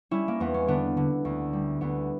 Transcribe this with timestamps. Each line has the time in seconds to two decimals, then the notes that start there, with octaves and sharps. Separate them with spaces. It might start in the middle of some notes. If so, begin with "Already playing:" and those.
0.11 G3 C#4 E4
0.28 A#3
0.40 E2 B3
0.54 C#4
0.68 D3 B3 D4
0.97 D3
1.25 D2
1.53 G3
1.81 D2 B3